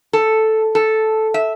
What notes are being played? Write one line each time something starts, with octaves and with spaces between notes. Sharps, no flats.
A4
A4
E5